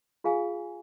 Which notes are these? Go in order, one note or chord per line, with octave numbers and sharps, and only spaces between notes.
F4 G#4 F5 G#5